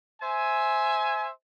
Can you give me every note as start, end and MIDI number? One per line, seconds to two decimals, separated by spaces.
0.22 1.29 72
0.22 1.29 76
0.22 1.29 80